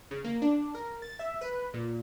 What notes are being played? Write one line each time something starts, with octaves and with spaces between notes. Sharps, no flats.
C#3
A#3
D4
A#4
A6
E5
B4
A#2